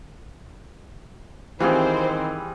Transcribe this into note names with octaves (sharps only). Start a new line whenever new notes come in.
D#3 E3 G3 C4 F4 G4 G#4 C5